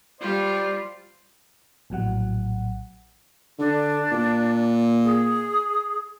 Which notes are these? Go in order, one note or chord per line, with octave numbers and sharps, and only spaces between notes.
G3 F4 C5 D5
A#1 A2 F#3 F#5
D3 D4
A#2
G#4